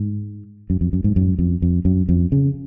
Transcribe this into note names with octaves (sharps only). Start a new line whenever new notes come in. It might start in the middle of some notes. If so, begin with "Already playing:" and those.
Already playing: G#2
F#2
F2
F#2
G#2
F#2
F2
F2
F#2
F2
C#3